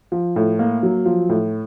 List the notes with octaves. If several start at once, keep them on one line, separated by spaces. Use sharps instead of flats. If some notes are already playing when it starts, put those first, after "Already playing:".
F3
A2
A#3
F#3
F3
A2